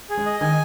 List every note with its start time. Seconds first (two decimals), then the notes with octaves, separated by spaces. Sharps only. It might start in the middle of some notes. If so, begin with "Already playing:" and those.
0.10 G#4
0.17 G#3
0.26 D#5
0.41 D#3 G#5